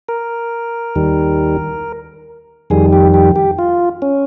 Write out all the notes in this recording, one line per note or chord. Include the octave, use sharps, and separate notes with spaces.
A#4
D#2 D#3 G3
F2 D#3 G3 G#4
G4
G4
G4
F4
C#4